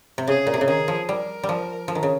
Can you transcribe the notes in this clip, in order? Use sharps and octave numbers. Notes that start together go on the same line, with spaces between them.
C3
C#3 G#4
A#2
C3
C#3
D#3 G#4
F3
G3 A#4
G3
F3
F3
D#3
C#3